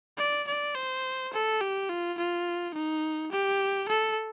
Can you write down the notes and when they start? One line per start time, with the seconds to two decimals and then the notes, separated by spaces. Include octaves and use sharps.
0.18 D5
0.47 D5
0.75 C5
1.33 A4
1.61 G4
1.89 F4
2.18 F4
2.74 D#4
3.32 G4
3.88 A4